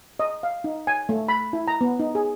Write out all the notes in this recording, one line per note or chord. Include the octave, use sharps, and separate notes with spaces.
D#5
F5
D#4
G#5
A3
B5
E4
A#5
B3
D#4
G#4